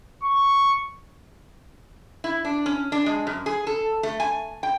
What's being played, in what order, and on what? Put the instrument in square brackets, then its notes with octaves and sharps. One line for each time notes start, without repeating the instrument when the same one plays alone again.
[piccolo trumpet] C#6
[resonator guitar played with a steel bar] E4
D4
C#4
D4
G#3
F#2
G#4
A4
A3
G#5
G5